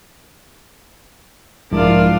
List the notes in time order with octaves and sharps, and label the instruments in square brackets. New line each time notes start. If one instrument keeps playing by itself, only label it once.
[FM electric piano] B1 F3 G#3 [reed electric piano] G#2 E4 A#4 [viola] D4 F4